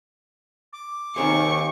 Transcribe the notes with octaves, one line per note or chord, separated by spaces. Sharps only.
D6
D#2 D#3 C4 G#4 C#6